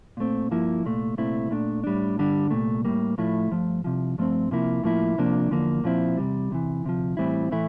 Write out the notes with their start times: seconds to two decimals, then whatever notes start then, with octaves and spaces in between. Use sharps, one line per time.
0.17 A#2 A3 C4
0.51 G2 F3 A#3 E4
0.84 C2 A#2 A3
1.17 C2 A#2 A3 C4 E4
1.51 A#2 A3 D4
1.84 A2 G3 D4
2.17 G2 D3 G3 D4
2.51 C2 A#2 A3
2.85 A2 G3 A#3
3.18 A2 F3 A3 E4
3.51 G2 F3 A3
3.84 C2 C3 F3
4.18 G2 F3 A3 C4
4.51 C3 F3 A#3 E4
4.84 A2 F3 A#3 E4
5.18 C3 F3 A#3 D4
5.50 E2 D3 F3 A#3
5.84 A#2 F3 C4 E4
6.17 E2 C3 G3
6.50 E2 C3 E3
6.84 D2 C3 F3
7.17 A2 E3 G3 C4 E4
7.51 A2 E3 A3 E4